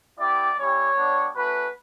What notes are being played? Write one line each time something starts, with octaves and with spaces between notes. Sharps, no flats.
B3 E4 G4 D5
G3 C#4 E4 G4 C#5
G3 B3 D4
A3 C#4 F#4 B4